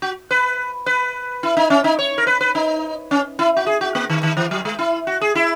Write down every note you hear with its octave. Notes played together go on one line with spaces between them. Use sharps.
F#4
B4
B4
E4
D#4
C#4
D#4
C#5
A#4
B4
B4
D#4
C#4
E4
F#4
G#4
F#4
A#3
D#3
D#3
E3
F#3
G#3
E4
F#4
G#4
E4